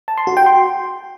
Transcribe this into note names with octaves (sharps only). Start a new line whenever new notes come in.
A5
C6
F#4
G5
C6